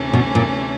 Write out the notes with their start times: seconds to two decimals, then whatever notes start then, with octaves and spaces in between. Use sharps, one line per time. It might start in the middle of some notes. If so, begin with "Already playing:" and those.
Already playing: D2 C3 E3 A3 C#4
0.13 B2
0.35 A#2